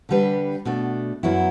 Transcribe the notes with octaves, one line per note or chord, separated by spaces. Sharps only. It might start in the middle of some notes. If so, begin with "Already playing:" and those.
D3 G3 D4 G4 B4
B2 A3 D4
F#2 F#3 B3 E4